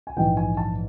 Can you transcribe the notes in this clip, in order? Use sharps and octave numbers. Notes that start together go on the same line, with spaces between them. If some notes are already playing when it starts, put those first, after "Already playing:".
G#5
A#1 G#2 E3 G5
G#5
A5